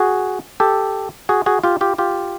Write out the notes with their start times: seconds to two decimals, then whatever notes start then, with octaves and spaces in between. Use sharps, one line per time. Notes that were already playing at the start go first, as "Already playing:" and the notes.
Already playing: F#4 G#4
0.60 G4 A4
1.29 F#4 G#4
1.46 F#4 G#4
1.64 F4 G4
1.81 F4 G4
1.98 F4 G4